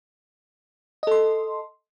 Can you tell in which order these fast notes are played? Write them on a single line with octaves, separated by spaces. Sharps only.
D#5 A4 C6